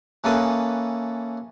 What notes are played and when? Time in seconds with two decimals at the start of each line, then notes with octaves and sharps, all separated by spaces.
0.24 E3 A#3 C#4 A4 B4 D#6